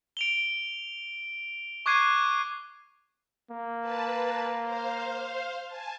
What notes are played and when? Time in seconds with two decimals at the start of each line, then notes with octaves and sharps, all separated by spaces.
0.17 D7 F7 G7
1.86 C#6 D6 F#6 G#6 C7 D#7
3.51 A#3
3.81 B4 A5
4.62 C5 F5
5.67 G#5 A5